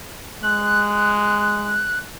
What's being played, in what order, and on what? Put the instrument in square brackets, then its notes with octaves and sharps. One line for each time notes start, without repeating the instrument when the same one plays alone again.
[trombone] G#3 [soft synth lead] F#6